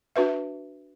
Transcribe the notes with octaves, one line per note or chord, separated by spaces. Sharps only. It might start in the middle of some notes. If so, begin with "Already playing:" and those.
D4 F#4 B4 E5